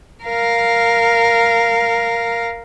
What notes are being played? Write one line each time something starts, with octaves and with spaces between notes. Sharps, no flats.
A#4 F5